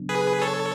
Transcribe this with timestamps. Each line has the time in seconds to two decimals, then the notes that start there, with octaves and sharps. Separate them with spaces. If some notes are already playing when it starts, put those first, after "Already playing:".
Already playing: C#3 F#3 B3 D4
0.09 G#4 B4
0.41 A4 C#5